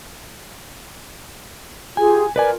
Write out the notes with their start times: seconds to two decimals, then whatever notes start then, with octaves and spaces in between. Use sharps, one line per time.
1.97 F4 G4 G#4 G#5
2.36 F4 A#4 B4 D5 G#5